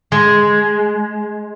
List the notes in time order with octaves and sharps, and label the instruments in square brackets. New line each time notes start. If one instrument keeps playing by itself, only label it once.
[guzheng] G#3